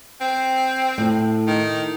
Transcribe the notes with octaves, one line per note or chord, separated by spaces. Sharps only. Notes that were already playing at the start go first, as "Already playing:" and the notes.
C4
A2
D#3